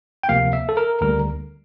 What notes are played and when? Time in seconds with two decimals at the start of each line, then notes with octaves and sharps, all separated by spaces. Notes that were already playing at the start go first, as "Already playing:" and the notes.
0.23 G5
0.29 D2 C3 F3 A#3 F5
0.53 E5
0.69 A4
0.77 A#4
1.01 D2 D3 G3 A#3 A#4